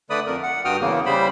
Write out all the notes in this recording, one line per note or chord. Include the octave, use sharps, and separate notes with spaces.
D3 A3 B4 D5 B5 D#6
F2 A#4
F#5
G2 F#4 G5 D#6 F6
E2 C#3 A#3
C#3 G3 C5 B5